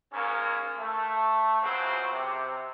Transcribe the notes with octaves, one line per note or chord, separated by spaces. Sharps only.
G#2 A#3 C#4
A3
C#2 C#3 F#3 C4 C5
C3